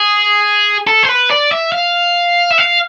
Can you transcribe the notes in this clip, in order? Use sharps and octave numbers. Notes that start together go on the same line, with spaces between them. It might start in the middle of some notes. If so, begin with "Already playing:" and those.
Already playing: G#4
A4
C5
B4
D5
E5
F5
E5
F5